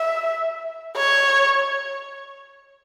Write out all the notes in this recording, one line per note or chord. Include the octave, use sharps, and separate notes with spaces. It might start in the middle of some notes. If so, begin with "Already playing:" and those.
Already playing: E5
C#5